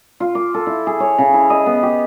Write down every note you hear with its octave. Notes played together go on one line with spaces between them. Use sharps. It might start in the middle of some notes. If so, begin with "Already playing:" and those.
F4
D6
A4
E4
G#4
C#5
C#3
E4
D#5
B3
G4